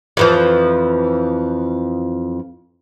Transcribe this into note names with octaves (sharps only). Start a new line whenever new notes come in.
F2 E3 F3